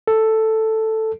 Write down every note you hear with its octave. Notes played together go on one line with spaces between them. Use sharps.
A4